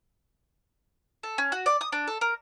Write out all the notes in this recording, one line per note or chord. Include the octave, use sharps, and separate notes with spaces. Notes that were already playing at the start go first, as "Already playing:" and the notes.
A4
C#4
F#4
D5
D#6
D4
A4
A#4